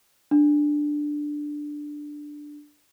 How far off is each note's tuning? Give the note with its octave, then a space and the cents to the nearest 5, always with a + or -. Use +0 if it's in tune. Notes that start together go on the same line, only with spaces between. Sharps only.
D4 +5